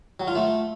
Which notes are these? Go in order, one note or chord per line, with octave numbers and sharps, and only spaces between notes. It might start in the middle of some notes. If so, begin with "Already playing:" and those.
F#3
F4
A3